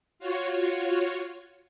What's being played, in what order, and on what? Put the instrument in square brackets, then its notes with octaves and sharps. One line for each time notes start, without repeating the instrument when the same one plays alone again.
[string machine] F4 F#4 C#5